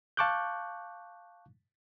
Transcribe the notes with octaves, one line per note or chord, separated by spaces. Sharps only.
F5 A5 C#6 D6 F#6 G6